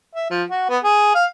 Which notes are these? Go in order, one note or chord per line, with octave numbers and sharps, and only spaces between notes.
E5
F3
F#4
B3
G#4
F5